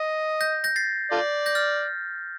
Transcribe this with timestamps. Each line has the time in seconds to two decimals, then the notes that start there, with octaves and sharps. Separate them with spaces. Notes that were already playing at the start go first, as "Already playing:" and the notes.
Already playing: D#5
0.41 G6 A#6
0.64 G6 A#6
0.76 A6 C7
1.12 F4 A4 D5
1.46 G6 A#6
1.55 F6 A6